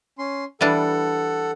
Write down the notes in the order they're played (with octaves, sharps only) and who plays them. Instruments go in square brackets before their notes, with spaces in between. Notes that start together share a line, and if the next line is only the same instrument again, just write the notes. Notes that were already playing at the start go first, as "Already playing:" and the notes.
[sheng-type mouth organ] C#4 C6
[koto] E3 G3 D4 [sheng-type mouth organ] A4 F#5